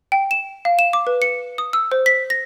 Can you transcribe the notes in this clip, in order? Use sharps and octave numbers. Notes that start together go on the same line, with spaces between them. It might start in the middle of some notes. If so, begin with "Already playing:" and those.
G5
E7
F5
E7
D6
B4
C#7
D#6
E6
C5
B6
A#6